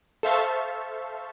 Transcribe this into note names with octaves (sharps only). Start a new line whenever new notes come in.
A4 C5 E5 F5 A5 C#6